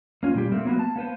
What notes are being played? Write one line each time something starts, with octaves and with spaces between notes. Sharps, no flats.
A#3 C#4 F4
A#2 G3 G4
A3 A#3 C4
F#3 A#3 B3
A5
A#3 B3 B4 C5